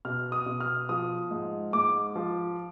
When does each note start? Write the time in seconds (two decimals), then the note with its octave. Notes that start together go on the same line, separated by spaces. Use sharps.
0.05 B2 F6
0.32 D#6
0.46 B2
0.60 F6
0.89 F3 D#6
1.31 G#2
1.73 G#2 D6
2.16 F3